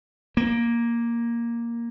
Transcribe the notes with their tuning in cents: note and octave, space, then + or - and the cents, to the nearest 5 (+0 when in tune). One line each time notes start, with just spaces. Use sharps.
A#3 +5